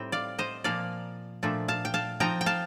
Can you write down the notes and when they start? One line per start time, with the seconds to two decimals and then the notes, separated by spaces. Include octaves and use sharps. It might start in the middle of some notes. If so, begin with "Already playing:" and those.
Already playing: A2 G3 C4 D#4 G5
0.12 D5 F5
0.39 C5 D#5
0.64 A#2 F3 A#3 D5 F5
1.43 A#2 F3 A3 D4
1.68 F5 A5
1.85 G5
1.94 F5 A5
2.20 F3 C4 D#4 G5 A#5
2.41 G5
2.46 F5 A5